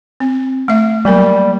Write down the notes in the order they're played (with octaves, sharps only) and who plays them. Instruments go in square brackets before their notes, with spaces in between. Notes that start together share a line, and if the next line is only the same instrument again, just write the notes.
[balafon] C4
A3 E5
[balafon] F#3 A#3 A#4 [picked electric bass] G3